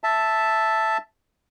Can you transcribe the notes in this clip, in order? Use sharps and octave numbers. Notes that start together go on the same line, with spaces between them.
E5 A5